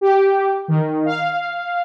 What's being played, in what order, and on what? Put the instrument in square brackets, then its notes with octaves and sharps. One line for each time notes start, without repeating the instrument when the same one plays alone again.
[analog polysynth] G4
D#3
F5